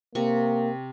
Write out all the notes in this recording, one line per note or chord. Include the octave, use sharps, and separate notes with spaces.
C3 A#3 C#6